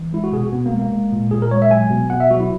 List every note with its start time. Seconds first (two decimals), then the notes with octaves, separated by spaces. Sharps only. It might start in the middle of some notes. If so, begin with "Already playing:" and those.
Already playing: E3
0.13 G#3 E4
0.24 F#4
0.33 B2 G#4
0.43 F#4
0.53 B2 B3
0.66 A#3
0.73 G#3
0.79 A#3
0.93 G#3
1.13 A#2
1.31 A#2 G#4
1.42 A#4
1.51 G#3 C#5
1.62 E5
1.71 F#3 G#5
1.90 B2
2.10 B2 F#5
2.20 E5
2.31 F#3 F#4
2.40 E4